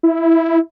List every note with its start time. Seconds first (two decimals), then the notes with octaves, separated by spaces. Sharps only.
0.03 E4